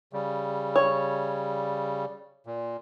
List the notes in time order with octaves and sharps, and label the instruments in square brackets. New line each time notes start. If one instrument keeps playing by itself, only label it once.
[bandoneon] C#3 G3
[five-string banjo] C#5
[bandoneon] A#2